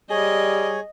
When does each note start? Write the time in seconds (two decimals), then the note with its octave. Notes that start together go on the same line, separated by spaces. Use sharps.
0.11 G3 G#4 C#5 D#5